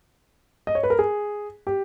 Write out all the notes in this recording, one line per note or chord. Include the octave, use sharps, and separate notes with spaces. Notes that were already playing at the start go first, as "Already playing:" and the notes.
D#5
C#5
B4
A#4
G#4
G4